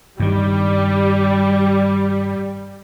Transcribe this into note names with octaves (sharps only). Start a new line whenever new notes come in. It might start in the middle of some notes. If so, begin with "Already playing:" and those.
G2 D#3 G3